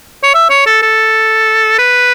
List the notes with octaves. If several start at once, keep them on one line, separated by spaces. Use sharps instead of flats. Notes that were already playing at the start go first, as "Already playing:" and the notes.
C#5
E5
C#5
A4
A4
B4